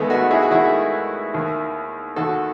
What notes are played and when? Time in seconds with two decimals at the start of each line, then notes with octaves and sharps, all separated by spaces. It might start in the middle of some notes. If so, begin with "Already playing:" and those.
Already playing: D#2 D#3 G#3 A3 B3
0.10 D#4 F#4
0.31 E4 G#4
0.42 F#4
0.51 D#2 D#3 E4 G#4
1.34 D#2 D#3
2.16 D#2 D#3 F#4 A4